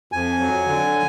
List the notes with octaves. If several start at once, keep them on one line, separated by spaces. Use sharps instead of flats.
F2 G#5
F#3
D3